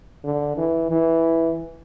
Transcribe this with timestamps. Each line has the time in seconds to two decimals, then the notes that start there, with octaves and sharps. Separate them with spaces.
0.24 D3
0.57 E3
0.91 E3